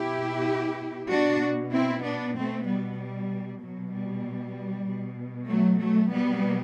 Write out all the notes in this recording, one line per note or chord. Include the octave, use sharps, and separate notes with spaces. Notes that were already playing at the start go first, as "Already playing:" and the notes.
Already playing: B2 E4 G4
B2 D4 F#4
C4 E4
B3 D4
B2 A3 C4
G3 B3
G3
B2 F#3
G3
B2
F#3 A3
F#3 A3
B2 G3 B3